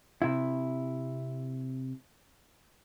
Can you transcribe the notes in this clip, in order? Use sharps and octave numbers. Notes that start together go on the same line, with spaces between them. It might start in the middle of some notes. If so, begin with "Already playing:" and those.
C3 E4